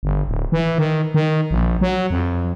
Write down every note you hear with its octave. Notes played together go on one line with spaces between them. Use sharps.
G1
D1
E3
D#3
D#3
A#1
F#3
F2